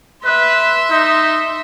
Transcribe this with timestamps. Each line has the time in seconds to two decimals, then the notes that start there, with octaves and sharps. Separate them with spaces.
0.25 B4 E5 C6
0.91 D#4